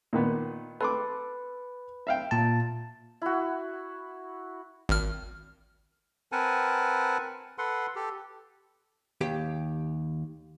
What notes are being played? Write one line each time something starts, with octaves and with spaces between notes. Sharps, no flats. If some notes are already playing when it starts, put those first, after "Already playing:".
A#2 D#3 B3
A4 B4 C6 D6
E5 F5 G5
A#2 A5
E4 F#4
G#1 F6
C4 A#4 B4 F#5 G#5 A5
A4 B4 F#5 C6
G4 A4
D#2 G4 G5